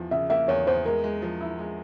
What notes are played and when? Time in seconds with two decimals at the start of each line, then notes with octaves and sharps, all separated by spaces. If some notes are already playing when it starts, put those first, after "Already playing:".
Already playing: E2 F3
0.11 C#3 E5
0.30 A#3 E5
0.48 E2 C#5
0.67 E2 C5
0.86 G#3 A#4
1.04 G#3
1.22 F3
1.41 E4
1.59 G#3